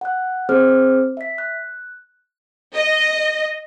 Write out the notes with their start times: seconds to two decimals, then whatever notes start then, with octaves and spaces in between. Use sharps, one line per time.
0.01 F#5 F#6
0.49 C4 G#4 C5 F6
1.17 E5 B6
1.38 F#6
2.75 D#5